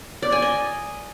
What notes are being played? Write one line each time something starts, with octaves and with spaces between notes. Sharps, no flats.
D5
G#5
D#5